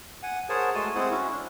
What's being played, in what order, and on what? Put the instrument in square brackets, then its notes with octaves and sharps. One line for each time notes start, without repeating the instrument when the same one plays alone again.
[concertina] F#5 G#5
G#4 A#4 C5 C#5 F#5 A5
G#3 A3 F#4 G#5 A5 C6
G#3 C4 E4 G#4 C5 F#5
C#4 E4 F#4
D4